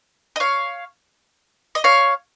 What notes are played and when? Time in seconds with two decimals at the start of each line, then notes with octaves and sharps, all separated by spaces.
0.36 D#5
0.40 C#5 F5
1.75 D#5
1.84 C#5 F5